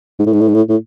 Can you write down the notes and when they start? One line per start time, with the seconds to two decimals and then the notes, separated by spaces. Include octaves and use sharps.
0.19 G#2
0.26 A2
0.33 G#2
0.41 A2
0.48 G#2
0.54 A2
0.69 A2